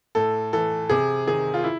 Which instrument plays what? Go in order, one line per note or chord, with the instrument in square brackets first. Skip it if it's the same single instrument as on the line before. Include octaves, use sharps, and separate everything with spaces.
[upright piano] A2 A4
E3 A4
C3 G#4
D#3 G#4
F4
E4